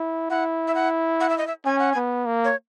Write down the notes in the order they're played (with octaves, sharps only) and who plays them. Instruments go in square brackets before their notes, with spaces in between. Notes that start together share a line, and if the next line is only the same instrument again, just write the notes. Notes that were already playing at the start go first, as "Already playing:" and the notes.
Already playing: [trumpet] E4
[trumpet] E4 [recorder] F#5
[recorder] E5
F#5
F#5
E5
D#5
E5
[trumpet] C#4 [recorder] G#5
[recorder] F#5
G#5
[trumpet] B3
A#3
[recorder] C#5